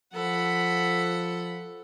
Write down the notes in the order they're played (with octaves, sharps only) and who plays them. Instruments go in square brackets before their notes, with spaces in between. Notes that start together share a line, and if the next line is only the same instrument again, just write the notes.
[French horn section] F3 [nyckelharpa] A4 [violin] F#5 B5